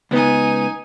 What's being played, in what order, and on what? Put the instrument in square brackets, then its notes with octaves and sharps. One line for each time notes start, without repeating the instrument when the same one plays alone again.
[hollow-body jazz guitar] C#2 B3 [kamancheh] D#4 G#5